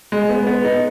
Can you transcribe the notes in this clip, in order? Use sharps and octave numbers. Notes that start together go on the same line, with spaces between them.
G#3
B3
B3
D#4